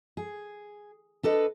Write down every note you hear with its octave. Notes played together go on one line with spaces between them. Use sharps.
G#4
D4 A4 B4 D#5